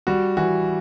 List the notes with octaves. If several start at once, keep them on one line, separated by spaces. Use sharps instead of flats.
G3 F#4
E3 F#4